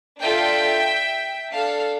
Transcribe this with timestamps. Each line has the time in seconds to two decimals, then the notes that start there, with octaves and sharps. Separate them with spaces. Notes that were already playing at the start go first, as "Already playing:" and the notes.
0.20 D4 F4 A4 E5 G5
1.52 D4 A4 F5 A5